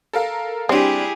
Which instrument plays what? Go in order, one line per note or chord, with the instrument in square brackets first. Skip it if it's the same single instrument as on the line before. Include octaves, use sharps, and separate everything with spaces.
[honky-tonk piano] A4 A#4 F5
[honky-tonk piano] G3 D4 [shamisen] C4 [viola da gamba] E4 G4 G#4